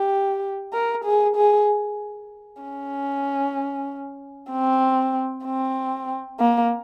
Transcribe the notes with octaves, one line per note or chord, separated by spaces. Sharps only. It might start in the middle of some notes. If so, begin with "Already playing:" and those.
Already playing: G4
A#4
G#4
G#4
C#4
C4
C4
A#3